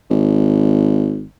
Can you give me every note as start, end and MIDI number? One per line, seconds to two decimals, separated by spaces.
0.10 1.27 32